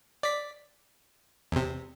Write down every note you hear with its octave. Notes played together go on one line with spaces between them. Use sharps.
D5 B6
E2 C3